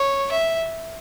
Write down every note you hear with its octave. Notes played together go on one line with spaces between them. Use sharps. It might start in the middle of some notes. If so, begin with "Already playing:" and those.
Already playing: C#5
E5